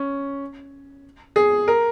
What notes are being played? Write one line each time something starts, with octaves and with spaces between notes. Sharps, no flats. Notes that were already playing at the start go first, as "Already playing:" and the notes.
Already playing: C#4
G#4
A#4